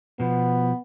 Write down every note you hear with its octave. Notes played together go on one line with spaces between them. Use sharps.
B2 F3 B3